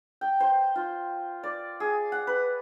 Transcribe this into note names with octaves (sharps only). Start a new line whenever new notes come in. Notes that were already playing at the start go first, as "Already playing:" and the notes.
G5
C5
F4
D5
G#4
F#5
B4